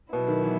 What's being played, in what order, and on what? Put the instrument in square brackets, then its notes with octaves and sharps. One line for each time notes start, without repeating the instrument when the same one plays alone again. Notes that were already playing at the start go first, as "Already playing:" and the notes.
[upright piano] B2 [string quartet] F#3 B3 E4
[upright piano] D#3
E3